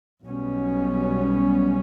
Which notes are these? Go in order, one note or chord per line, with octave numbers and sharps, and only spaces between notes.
B1 B2 G3 C#4